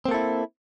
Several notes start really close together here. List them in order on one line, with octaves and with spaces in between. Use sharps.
C4 A#3 A4 E4